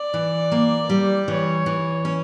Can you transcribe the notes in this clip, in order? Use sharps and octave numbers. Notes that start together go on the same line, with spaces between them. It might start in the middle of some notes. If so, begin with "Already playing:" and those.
Already playing: D5
E3
A#3
G3
E3 C#5
E3
C#4